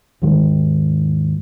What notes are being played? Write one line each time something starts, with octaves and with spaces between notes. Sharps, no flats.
D#2 G#2 D#3 G#3